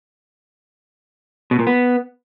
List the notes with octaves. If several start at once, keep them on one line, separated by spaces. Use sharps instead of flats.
B2
A#2
B3